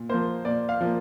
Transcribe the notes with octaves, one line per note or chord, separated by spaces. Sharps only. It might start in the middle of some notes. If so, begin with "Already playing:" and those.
Already playing: A#2
F3 A#3 C5
A#2 D5
F5
F3 A#3